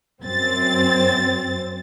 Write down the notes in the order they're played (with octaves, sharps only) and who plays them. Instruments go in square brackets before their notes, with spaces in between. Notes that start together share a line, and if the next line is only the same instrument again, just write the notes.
[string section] F#2 C4 A6